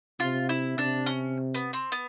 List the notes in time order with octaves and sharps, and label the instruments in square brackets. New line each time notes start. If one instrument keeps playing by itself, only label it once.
[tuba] C3 [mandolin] F4
[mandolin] E4
[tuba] C3 [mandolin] D4
[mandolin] C#4
B3
C4
B3